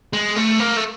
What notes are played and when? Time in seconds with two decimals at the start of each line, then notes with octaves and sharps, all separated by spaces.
0.13 G#3
0.36 A3
0.60 A#3
0.77 A3